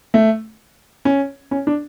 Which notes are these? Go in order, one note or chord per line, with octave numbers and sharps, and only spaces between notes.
A3
C#4
C#4
D4